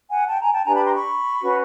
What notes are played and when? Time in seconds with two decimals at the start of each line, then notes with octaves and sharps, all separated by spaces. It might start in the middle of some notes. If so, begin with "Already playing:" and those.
0.10 F#5 G#5
0.28 G5 A5
0.41 G#5 A#5
0.53 G5 A5
0.66 D4 G4 B4 G#5 A#5
0.76 A5 B5
0.84 A#5 C6
0.95 B5 C#6
1.41 C#4 F#4 B4